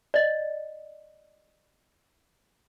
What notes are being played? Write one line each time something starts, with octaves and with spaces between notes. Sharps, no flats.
D5 D#5